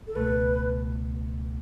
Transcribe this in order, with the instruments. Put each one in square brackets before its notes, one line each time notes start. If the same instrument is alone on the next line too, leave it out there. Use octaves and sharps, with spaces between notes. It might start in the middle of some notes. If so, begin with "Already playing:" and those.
[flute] A4
[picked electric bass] C#2 B2 A3 [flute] B4